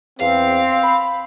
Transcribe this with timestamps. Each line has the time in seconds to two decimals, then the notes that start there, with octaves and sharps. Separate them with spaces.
0.20 E2 C4 F5
0.83 B5